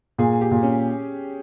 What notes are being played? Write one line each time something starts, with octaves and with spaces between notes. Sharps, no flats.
A#2 G#4
G4
A#2
C#4